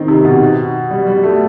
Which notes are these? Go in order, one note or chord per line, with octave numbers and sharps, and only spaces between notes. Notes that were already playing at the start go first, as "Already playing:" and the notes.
Already playing: D#3 C4 D#4
C3
B2
G3
G3
A3